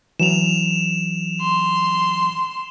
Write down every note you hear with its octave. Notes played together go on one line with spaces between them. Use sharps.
E3 F#3 E7 F7
C6